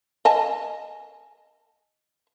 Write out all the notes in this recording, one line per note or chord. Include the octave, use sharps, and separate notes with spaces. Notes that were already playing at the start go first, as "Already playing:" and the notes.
D#5 G#5 A5